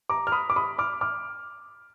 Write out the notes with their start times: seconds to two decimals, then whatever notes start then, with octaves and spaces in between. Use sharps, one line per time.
0.09 A#5 D6
0.27 F6
0.32 B5 D#6
0.50 D6
0.56 B5 D#6
0.78 D6 F6
1.01 D6 F6